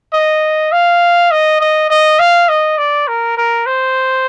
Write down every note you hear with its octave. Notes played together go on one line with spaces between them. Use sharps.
D#5
F5
D#5
D#5
D#5
F5
D#5
D5
A#4
A#4
C5